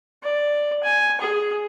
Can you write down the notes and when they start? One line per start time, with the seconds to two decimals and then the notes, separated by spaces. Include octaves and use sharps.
0.23 D5
0.83 G#5
1.21 G#4